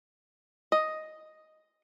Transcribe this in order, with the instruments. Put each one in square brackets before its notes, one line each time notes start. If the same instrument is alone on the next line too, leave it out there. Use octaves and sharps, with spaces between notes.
[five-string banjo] D#5